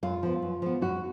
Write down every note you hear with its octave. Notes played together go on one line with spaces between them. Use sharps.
F#2 F4
F3 B3
F#2
F3 B3
F#2 F#4